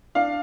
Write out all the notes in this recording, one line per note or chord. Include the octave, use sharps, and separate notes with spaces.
D4 F5